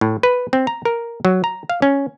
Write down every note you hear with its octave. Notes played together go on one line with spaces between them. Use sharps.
A2
B4
C4
A#5
A#4
F#3
A#5
F5
C#4